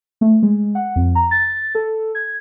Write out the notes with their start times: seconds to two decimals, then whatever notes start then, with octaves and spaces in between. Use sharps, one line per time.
0.21 A3
0.42 G#3
0.75 F#5
0.96 F2
1.15 A#5
1.31 A6
1.75 A4
2.15 G#6